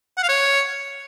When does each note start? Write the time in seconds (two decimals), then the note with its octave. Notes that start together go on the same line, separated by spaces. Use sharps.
0.17 F#5
0.23 F5
0.29 C#5